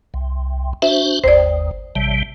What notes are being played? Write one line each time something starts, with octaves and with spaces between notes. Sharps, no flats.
C2
D4 F#4 C5 E5
G1 D#2 C5 D5
A1 C3 G3